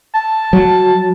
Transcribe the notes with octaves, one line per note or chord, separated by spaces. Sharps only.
A5
F#3